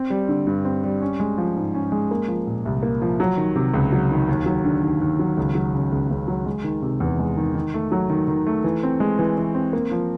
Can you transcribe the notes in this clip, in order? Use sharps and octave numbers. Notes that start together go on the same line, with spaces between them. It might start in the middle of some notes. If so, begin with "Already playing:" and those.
Already playing: C4
G3
D3
G2
C4
G3
C#4
G#3
F3
G#2
C#4
G#3
A#3
F3
A#2
C2
A#3
F3
F#3
D#3
C3
C#2
F#3
D#3
D#2
F#3
D3
D#2
D#2
F#3
C#2
F#3
C#3
C#2
C#2
F#3
G#3
D#3
C3
E2
G#3
D#3
D#3
A3
F#3
D#3
D#3
A3
E3
C4
G#3
E3
E3
C4
A#3
F3